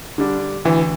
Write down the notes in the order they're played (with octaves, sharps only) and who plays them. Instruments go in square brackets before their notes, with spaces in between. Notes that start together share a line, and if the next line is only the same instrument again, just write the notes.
[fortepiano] D3 G3 D4
[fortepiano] D2 [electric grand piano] E3